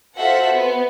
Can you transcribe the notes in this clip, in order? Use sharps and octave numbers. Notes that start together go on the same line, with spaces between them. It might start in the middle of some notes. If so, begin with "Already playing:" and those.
F4 F#4 A4 C5 E5 F#5
B3